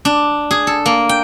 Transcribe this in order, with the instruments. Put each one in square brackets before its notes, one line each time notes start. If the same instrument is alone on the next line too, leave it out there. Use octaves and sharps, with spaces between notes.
[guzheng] D4
G#4
A4
A#3
G5